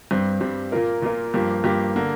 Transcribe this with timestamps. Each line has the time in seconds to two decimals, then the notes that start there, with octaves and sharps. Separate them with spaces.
0.11 G2 G3 C4
0.41 G2 G3 C4
0.72 A#2 A#3 F4 A#4
1.02 A#2 A#3 F4 A#4
1.34 G2 F3 A#3 G4
1.64 G2 F3 A#3 G4
1.96 D3 A#3